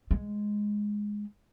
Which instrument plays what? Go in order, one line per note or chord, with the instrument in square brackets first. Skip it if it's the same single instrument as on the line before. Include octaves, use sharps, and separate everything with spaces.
[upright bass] G#3